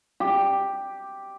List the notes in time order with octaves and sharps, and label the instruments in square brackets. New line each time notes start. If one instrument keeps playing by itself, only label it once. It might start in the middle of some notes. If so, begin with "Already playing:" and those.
[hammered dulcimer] G4